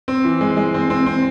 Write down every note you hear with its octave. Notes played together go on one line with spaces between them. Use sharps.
C4
E3
G#3
G#3
C4
C4
C4